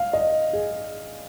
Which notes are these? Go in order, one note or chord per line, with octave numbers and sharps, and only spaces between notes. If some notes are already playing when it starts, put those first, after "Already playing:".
Already playing: F5
D#5
G#4